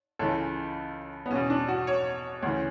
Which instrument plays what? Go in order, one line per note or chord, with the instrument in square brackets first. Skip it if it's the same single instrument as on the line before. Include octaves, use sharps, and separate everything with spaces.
[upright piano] C#2 C#3 E3 A4
B3
E2 B2 C#4
D4
F#4
C#5
D2 C#3 E3